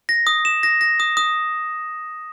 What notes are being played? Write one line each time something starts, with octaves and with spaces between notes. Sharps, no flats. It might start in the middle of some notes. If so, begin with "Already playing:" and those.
A#6
D#6
E7
A#6
A#6
D#6
D#6